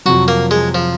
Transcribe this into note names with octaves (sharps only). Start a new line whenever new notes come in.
F2 C3 F#3 F#4
A#3
G#3
F3